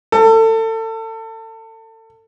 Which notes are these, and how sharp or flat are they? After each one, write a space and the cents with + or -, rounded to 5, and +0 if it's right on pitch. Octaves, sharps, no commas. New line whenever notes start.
A4 +30